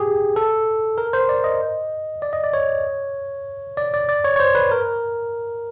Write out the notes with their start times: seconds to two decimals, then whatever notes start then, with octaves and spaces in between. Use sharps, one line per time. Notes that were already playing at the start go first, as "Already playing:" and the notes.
Already playing: G4 G#4
0.36 A4
0.98 A#4
1.13 C5
1.29 D5
1.44 D#5
2.22 D5
2.33 D#5
2.44 D5
2.53 C#5
3.77 D5
3.94 D5
4.09 D5
4.24 C#5
4.36 C#5
4.40 C5
4.55 B4
4.71 A#4